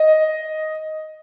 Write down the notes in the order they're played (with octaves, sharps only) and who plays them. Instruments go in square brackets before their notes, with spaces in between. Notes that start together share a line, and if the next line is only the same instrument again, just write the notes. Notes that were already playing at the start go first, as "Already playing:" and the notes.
Already playing: [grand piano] D#5